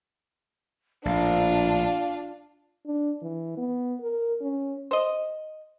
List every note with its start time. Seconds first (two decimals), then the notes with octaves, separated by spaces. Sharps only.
1.05 A#1 A2 D4 F4 F5
2.86 D4
3.22 E3
3.57 B3
4.01 A#4
4.41 C#4
4.91 C5 D#5